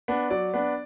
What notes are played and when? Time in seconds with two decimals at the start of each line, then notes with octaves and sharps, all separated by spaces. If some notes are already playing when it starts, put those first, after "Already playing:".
0.08 B3 D4
0.30 F#3 D5
0.54 B3 D4